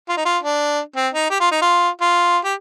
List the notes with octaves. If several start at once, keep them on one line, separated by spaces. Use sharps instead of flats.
F4
D#4
F4
D4
C4
D#4
G4
F4
D#4
F4
F4
G4